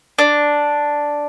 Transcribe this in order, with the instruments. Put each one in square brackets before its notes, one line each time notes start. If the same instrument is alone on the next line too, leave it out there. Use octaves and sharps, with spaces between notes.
[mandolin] D4